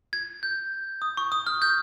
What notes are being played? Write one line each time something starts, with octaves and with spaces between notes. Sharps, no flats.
G#6
G6
D#6
C#6
D#6
F6
G6